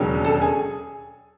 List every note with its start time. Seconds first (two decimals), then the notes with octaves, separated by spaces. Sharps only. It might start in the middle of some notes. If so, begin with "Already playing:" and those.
Already playing: E1 D#2 C#3 F#3 C#4
0.24 A4 A5
0.42 G#4 G#5